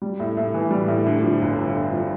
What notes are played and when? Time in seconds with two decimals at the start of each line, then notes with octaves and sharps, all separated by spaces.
0.02 G3
0.20 A2
0.37 A2
0.54 E3
0.71 G3
0.88 A2
1.06 D3
1.23 F3
1.41 G1
1.58 G2
1.75 D3
1.93 F3